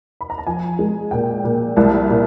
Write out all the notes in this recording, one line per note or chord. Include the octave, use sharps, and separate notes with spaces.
B5
A#5
A5
F3 G#5
G#3
A#2 G5
A#2
C2 A5
A#2